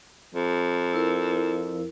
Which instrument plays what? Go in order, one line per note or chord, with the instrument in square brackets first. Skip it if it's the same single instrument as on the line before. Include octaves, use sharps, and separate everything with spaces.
[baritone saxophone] F2
[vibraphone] E4 A#4